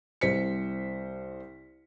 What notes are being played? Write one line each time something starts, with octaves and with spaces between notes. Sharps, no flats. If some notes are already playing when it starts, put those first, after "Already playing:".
C2 C5 B6 C#7